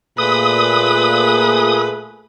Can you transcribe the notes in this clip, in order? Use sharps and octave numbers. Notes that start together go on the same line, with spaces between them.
A#2 A3 F4 G#4 B4 D#6